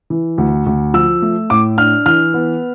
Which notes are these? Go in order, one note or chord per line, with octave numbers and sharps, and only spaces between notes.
E3
D2
D2
F3 E6
A3
A2 D6
D4 F6
E3 F6
B3